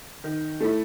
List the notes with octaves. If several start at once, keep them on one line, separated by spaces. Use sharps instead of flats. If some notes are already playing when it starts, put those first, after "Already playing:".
D#3
A3 E4